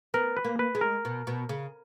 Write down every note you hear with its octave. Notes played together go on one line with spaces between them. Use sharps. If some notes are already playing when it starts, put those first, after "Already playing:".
B3 A#4
B4
A#3
B4
G#3
A#4
B2
B2
C#3